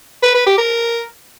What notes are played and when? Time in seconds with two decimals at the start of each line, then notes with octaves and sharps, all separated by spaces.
0.23 B4
0.35 B4
0.46 G4
0.58 A#4